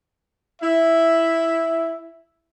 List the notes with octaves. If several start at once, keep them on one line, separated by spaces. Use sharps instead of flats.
E4 E5